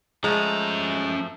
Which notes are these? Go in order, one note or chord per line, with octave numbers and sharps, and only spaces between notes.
F3 G#3 A3 C#4 A#5